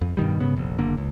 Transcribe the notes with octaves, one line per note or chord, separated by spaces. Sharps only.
F2
G2 B2 D#3 G3
G#2 C#3 B3
F1 A#1
F#1 D3 A#3
C#2